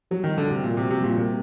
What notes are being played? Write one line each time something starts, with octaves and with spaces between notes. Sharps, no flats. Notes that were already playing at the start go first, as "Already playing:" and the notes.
F#3 G3
D#3
G3
D3
C3 F#4
A#2 A#3
C3
F#4
C3
A#2 G3
C3 A#3